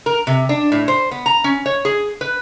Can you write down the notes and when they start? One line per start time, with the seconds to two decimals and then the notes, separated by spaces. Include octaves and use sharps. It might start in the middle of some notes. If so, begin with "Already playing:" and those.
0.06 A#4
0.27 C3
0.49 D4
0.72 A2
0.88 C5
1.11 B3
1.26 A#5
1.44 C#4
1.66 C#5
1.85 G#4
2.21 B4